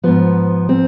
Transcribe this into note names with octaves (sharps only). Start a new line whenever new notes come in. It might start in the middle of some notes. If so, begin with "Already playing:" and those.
G#2 F3 B3
C4